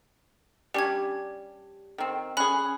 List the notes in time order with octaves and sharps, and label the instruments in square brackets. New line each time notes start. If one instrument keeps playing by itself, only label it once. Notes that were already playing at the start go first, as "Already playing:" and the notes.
[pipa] G3 C#4 D4 [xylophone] G4 G#6
[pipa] D#3 C4
[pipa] C#4 G#4 [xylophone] B5 F#6